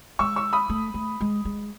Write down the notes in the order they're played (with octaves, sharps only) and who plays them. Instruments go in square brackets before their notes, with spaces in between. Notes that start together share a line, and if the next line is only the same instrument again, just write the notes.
[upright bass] G#3 [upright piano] C#6 E6
[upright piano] C#6 E6
B5 D#6
[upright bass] A3
A3
G#3
G#3